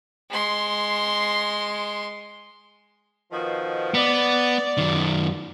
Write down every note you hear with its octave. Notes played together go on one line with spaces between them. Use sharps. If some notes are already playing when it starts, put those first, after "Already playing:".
G#3 C6
B2 D#3 F3
B3 D5
F#2 D#3